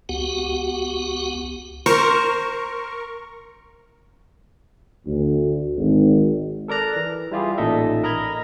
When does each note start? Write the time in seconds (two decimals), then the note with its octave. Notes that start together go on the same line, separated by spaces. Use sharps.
0.09 C#2 B3 F#4 G4 F#5
1.86 A#4 C5 C#6
5.06 D2
5.76 G#1
6.68 A4 A#4 D5 A#5 F#6
6.96 E3
7.31 G3 E4 F4 G4 G#4
7.58 A1 A#2 D#4 A4 D#5 E5
8.04 A#4 D#5 A#5 B5 G#6